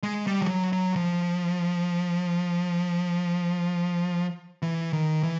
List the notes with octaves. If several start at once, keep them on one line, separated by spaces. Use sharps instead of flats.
G#3
G3
F3
F#3
F#3
F3
E3
D#3
E3